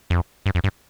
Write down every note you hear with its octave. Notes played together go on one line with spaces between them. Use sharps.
F2
G2
F2
G2